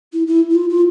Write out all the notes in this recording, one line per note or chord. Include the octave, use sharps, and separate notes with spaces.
E4
E4
E4
F4
F4